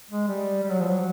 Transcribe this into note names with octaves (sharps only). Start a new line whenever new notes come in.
G#3
G3
G3
F#3
F3
F#3